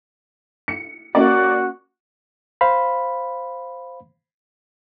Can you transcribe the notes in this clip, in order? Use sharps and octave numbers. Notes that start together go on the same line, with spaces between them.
C#7
A#3 C#4 F#4 D5
C5 F5 B5